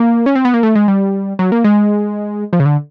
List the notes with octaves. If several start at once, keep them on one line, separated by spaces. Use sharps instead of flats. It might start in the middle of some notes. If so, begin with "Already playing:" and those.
Already playing: A#3
C#4
C4
B3
A#3
A3
G#3
G3
F#3
A#3
G#3
F3
C#3
D3